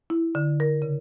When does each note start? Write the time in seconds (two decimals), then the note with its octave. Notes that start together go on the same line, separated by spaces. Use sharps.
0.10 E4
0.35 D3
0.60 A#4
0.82 C#3